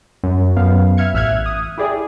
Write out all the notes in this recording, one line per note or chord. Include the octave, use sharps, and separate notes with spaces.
F#2
F#2 B3 F5
E5 F6 G#6 C#7
A1 E5 F6 F#6 G#6
D#6
E4 G4 G#4 D5